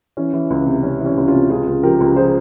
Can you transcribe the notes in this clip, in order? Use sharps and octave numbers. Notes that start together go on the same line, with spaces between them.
E3 C#4
E3
C#2
C3
C3 C#4
E3
C#4
C#2
C#4 F4
C3
C#2 F4 G#4
C#2
F3 G4 A#4
C#2
F3 G#4 C5